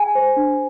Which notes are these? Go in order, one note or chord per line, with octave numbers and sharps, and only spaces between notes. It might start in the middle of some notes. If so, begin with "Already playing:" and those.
Already playing: G#4 G#5
C5
D4